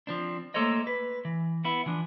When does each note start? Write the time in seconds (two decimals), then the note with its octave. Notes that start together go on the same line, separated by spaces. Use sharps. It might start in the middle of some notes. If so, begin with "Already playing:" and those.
0.07 F3 C4 D4
0.54 A3 A#3 A4 C5 C#5 D#5
0.87 B4
1.25 E3
1.65 B3 E4
1.86 E3 F3 D4